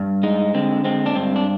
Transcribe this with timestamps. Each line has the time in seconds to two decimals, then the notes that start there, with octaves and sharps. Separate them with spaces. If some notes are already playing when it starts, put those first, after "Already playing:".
Already playing: G2
0.23 G#3 D#4
0.54 D3 C4
0.84 G#3 C4
1.06 D4
1.15 G2 C4
1.36 D4